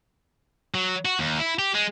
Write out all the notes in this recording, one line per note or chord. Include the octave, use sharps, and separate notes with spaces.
F#3
F#4
D#2
E4
G4
G#3